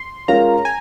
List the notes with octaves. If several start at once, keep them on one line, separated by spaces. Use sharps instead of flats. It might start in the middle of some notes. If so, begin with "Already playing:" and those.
Already playing: C6
G#3 C#4 F4 A#4 F5 A#5
G#5